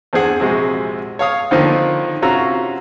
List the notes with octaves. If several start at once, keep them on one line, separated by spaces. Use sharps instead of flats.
E2 C4 D4 G#4 F#5
A#1 C3 G#3 F#4
C#5 F5 D#6
D3 D#3 F3 A#3 C4 D#4
C3 C#4 F4 F#4 A#5 E6